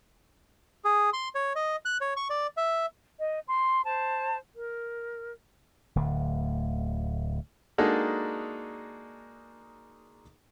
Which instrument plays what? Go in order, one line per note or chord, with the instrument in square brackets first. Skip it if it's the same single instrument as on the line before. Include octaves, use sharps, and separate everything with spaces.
[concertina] G#4
C6
C#5
D#5
F#6
C#5
C#6
D5
E5
[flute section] D#5
C6
C5 A5
A#4
[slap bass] D1 D2
[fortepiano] G#3 A#3 D4 D#4 F#4 A4